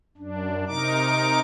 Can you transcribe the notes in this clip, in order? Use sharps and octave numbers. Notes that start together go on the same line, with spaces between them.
F#2 D4
C3 D#4 A#4 D6